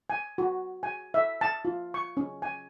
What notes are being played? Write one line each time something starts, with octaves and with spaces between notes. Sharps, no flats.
G#5
F#4
G#5
E5
A5
F4
C#6
C#4
G#5